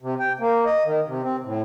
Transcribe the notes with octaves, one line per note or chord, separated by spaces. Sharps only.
C3
G5
A#3
D#5
D#3
C3
C4
A2